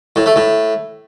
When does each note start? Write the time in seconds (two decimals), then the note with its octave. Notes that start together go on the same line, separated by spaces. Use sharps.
0.16 A2
0.26 A3
0.36 A2